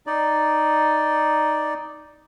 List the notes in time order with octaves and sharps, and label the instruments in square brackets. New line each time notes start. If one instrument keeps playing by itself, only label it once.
[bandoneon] D#4 D5